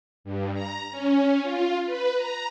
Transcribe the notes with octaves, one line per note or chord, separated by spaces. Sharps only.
G2
A#5
C#4
F4
B4
A#5